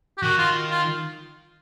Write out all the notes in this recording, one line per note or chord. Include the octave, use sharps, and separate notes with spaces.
G4
D#3 F#4
F4
F4